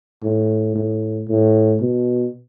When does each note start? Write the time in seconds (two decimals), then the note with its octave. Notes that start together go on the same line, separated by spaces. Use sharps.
0.23 A2
0.75 A2
1.28 A2
1.81 B2